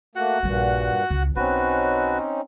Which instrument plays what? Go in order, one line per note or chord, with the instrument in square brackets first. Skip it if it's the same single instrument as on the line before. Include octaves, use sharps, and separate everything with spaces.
[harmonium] A3 A#3 [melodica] F#4 F#5
[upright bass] A#1 G3 [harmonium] G2 A#2
[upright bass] C#2
[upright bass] B1 [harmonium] C4 C#4 D#4 [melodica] F#4 B4